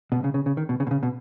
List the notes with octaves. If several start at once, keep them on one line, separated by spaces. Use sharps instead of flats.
B2
C#3
C#3
C#3
D#3
B2
C#3
B2
C#3
B2